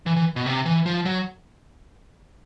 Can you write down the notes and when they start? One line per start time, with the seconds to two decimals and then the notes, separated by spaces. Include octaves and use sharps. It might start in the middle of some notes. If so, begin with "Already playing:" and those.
0.06 E3
0.16 E3
0.36 B2
0.46 C3
0.65 E3
0.86 F3
1.05 F#3